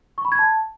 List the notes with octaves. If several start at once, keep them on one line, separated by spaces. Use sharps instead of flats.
C#6
B5
G#6
A5